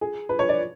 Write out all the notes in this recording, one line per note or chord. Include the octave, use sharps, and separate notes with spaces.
G#4
B4
C#5
D5